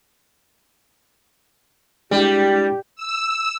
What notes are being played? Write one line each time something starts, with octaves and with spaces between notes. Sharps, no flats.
G3 G#3 D4 E4 G4
E6